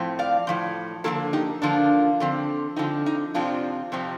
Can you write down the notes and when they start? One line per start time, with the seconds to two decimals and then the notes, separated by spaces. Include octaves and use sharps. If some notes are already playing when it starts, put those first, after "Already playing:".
Already playing: A2 F3 C4
0.19 D5 F5
0.47 A2 F3 C4
1.04 D3 F3 A#3 F4 A4
1.33 D#4 G4
1.62 D3 F3 A#3 D4 F4
2.20 D3 F3 C4
2.76 D3 F3 C4 D#4
3.06 D#4
3.34 F2 C3 F3 C4 D4 F4
3.92 F2 C3 F3 C4